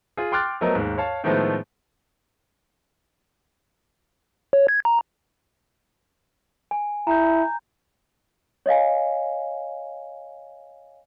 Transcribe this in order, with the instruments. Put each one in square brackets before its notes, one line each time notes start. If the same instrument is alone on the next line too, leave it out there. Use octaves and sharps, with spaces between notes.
[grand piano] F4 G#4
G5 C6 D6 F6 F#6 A6
F3 F#3 A3 B3 A#4 D#5
D#2 G#2
C#5 F5 A5
A2 D#3 F3 G#3 A3 B3
[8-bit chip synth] C#5
G#6
A#5
[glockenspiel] G#5
[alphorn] E4 [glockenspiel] A#5 G6
[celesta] C#5 D#5 F5 G#5